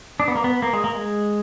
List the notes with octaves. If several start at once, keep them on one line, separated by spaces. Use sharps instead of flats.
D4
B3
A#3
B3
A#3
G#3
A#3
G#3